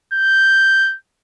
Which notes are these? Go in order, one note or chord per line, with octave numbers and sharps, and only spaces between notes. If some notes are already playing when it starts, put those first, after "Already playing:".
G6